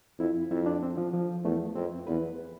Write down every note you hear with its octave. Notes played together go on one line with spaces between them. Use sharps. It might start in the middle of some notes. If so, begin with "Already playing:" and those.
F2 E4
F2 E4
D4
C4
F3
F3
E2 A3
F2 C4
E2 B4